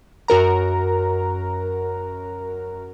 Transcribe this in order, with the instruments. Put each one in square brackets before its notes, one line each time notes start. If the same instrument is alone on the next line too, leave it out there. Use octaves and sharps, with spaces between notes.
[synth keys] F#2 F#4 A#4 A#5